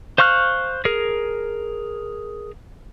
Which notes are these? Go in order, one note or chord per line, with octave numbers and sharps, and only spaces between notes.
C5 F5 C#6 F6 F#6
G#4 A#4